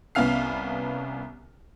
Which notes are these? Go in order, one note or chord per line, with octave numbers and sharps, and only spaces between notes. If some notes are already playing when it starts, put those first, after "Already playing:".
C2 B3 C#4 F5 F6 C7